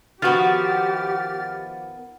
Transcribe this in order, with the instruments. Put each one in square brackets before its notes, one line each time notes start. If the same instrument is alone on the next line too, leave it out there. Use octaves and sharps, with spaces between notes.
[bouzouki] D#3 B3 [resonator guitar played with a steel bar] F3 F#4 [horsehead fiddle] G4 [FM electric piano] F6 A6